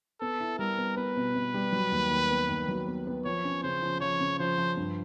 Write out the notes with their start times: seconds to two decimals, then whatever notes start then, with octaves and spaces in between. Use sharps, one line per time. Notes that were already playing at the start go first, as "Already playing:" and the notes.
0.21 B3 A4
0.40 E4
0.59 G3 A#4
0.78 B3
0.96 B3 B4
1.16 B2
1.35 B2
1.54 G3
1.73 F#3
1.92 D#2
2.11 D#2
2.30 B3
2.49 D#2
2.68 F#3
2.88 B3
3.07 B3
3.25 F3 C#5
3.45 C#4
3.63 C#3 C5
3.82 F3
4.01 F3 C#5
4.20 C#3
4.39 F3 C5
4.58 F3
4.77 G2